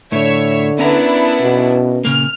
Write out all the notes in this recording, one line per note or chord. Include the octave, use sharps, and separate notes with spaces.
A2 D3 C#5 E5
B3 C#4 D4 E4 A#4 A#5
B2
A#2 C#3 A#3 F6